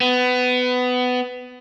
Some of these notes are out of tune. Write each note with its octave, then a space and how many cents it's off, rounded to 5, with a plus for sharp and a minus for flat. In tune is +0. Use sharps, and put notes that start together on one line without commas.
B3 +20